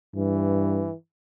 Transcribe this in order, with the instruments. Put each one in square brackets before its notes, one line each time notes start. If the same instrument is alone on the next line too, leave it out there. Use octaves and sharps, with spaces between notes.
[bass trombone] G2 [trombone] E3